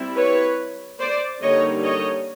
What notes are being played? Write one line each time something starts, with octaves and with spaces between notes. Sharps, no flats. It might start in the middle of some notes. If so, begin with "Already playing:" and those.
Already playing: G3 C4 E4
B4 C#5
C5 D5
D3 G3 A#3 D#4 C#5 D#5
C#5 D#5